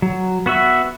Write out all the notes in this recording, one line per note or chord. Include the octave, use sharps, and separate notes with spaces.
F#3
B3 F#4 E5